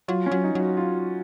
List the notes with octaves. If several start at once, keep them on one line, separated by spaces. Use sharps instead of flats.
F#3 F4
C#4
F#3
D#4
F#3
F#4
F4